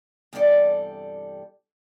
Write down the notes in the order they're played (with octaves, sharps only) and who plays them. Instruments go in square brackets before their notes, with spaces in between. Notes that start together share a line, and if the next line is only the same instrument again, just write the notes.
[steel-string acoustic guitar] E2 G2 C3 G3 A4 D5